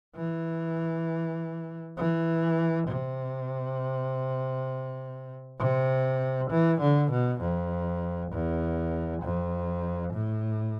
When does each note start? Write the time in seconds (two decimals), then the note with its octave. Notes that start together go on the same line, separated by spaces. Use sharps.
0.16 E3
1.97 E3
2.88 C3
5.59 C3
6.50 E3
6.81 D3
7.11 B2
7.41 F2
8.32 E2
9.22 F2
10.13 A2